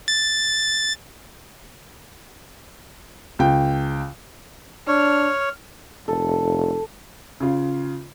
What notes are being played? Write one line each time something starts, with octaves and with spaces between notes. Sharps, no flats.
A6
C#2 G5
D4 C#5 F6
F1 A4
C#3 F4